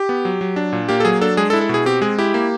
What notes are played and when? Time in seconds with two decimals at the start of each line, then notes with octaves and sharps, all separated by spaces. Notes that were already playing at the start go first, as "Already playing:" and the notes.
Already playing: G4
0.09 B3
0.25 F#3
0.41 F#3
0.56 D4
0.72 A#2
0.89 A#3 G4
1.00 A4
1.05 F#3 G#4
1.21 D4 A4
1.37 G#3 G#4
1.50 A4
1.53 E4
1.61 A4
1.69 B2 G#4
1.86 C4 G4
2.01 G#3 G#4
2.19 E4 G4
2.34 A#3